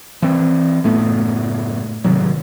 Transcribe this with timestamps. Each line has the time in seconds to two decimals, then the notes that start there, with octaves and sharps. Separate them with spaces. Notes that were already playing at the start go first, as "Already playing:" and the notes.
0.22 E3 C4
0.84 F#1 A2 A3 B3
2.04 G#1 C3 D#3 F#3